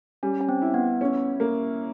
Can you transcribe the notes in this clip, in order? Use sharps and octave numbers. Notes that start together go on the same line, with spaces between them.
G3 C#4
C#4
C4
E4
B3
C#4
A#3